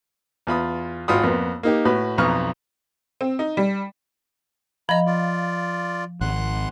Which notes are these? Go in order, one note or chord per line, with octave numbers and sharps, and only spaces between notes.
E2 F4 B5 D#6
G#1 F4 F#4 F#5 B5 D#6
F2 A#3 B3
A#3 D#4 G4
A2 F#4 B4
B1 F2 B4 A#5 C#6 F6
C4
D#4
G3
F3 D#5 A#5 B5
F4 D5
G#1 F#5 C6 F#6